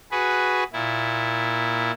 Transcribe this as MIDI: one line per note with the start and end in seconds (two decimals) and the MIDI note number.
0.11 0.64 66
0.11 0.64 68
0.11 0.64 71
0.73 1.91 46
0.73 1.91 64